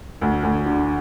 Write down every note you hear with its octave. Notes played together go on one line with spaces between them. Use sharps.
D2
D2
D3